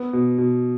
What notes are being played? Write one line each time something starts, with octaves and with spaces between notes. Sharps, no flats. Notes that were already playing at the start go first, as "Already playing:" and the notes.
Already playing: B3
B2
B2